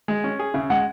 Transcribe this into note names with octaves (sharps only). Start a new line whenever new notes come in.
G#3
C#4
G#4
C#3 E5
G#3 F#5